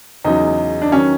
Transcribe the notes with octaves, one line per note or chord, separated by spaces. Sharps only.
E2 C#3 F#3 D#4
D4
D#3 F#3 C#4